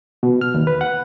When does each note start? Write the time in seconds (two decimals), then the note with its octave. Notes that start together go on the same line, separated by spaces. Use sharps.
0.23 B2
0.41 F6
0.54 D#2
0.67 B4
0.81 F#5